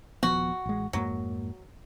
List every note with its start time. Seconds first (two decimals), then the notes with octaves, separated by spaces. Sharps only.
0.23 D#1 F3 B3 F#4
0.66 A1 G#3
0.93 F2 G#2 F#3 A#3